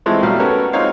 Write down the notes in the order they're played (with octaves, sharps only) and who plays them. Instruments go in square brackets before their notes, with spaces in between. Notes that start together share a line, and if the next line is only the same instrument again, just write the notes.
[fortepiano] E3 F3 G#3 A3 C4
B1 F#3 G3 A3 F5
B3 C#4 F#4 A4 A#4 C#5
G#3 C4 D#4 F4 C#5 F5